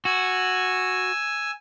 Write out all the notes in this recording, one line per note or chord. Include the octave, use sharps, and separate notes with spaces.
F#4 G#5 E6